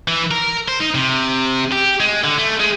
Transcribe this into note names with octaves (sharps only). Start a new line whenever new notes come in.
E3
A#4
C5
D#4
C3
G4
G#3
D3
A3
G#3